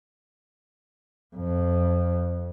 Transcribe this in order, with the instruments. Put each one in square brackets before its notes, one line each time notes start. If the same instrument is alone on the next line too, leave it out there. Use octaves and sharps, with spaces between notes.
[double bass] F2